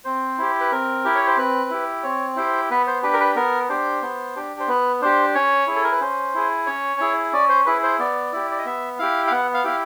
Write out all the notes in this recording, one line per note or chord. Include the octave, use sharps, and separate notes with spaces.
C4 C5
E4 G4
B4
C4 A#4
E4 G4
C#5
C5
C4 B4
E4 G4
C4 C#5
E4 G4 C5
B3 B4
C5
D4 G4 B4
A#4
B4
B3 A#4
D4 G4 C5
B3
D4 G4
C5
B3 B4
D4 G4 C5
C#4 C#5
E4 G#4
A4
A#4
B4
C#4 C5
E4 G#4
C#4 C#5
E4 G#4
C#4 D5
C5
E4 G#4 B4
C5
B3 D5
E4 G4
D5
D#5
B3 E5
E4 G4 F5
F5
B3 F#5
F5
E4 G4 F5